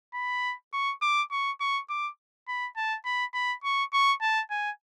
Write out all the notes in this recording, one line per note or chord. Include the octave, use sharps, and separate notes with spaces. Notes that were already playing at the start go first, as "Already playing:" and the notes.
B5
C#6
D6
C#6
C#6
D6
B5
A5
B5
B5
C#6
C#6
A5
G#5